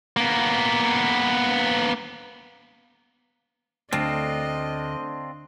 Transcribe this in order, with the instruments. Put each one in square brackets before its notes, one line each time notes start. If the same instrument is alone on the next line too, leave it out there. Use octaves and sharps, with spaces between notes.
[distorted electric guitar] A#3 B3
[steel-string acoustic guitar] D2 [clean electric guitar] C4 D4 F4 [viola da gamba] D#5